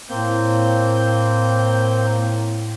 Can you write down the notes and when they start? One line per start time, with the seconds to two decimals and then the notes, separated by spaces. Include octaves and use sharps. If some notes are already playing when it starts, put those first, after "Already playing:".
0.10 A2 A#3 C4 G6